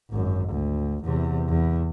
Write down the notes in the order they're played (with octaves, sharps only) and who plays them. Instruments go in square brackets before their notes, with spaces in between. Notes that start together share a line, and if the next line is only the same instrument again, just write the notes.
[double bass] G#1 F#2
D2
E2 C3
E2